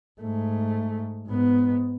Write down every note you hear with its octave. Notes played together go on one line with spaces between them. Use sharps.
G#2 A3
G#2 B3